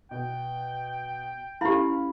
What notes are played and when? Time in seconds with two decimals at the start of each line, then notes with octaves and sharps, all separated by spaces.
0.11 B2 G5
1.61 C#4 E4 G4 F5 B5